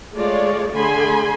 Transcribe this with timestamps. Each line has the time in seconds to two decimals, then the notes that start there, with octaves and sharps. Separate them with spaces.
0.14 G#3 A3 F4 C#5 D5
0.73 D3 A3 G#4 G#5 B5 C6